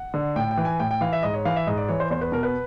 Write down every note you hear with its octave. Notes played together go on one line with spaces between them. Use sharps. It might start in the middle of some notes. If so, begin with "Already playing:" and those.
Already playing: F#5
D3
A2 G5
G5
E3
G#5
A2 G5
G5
E3 F5
E5
G#2 D#5
C#5
E3 F5
E5
G#2 D#5
D5
E3 C#5
C5
E2 C5
B4
B2 A#4
B4